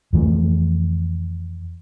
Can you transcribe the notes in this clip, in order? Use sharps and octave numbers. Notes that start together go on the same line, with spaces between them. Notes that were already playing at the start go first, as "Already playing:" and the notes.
F2 E3 A3